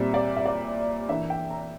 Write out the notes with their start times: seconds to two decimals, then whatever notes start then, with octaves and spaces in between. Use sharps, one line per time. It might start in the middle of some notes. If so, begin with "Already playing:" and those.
Already playing: A#2 G3 C4 E5
0.14 D5
0.36 E5
0.45 D5
1.09 E3 A#3 D4 E5
1.30 G5
1.51 A#5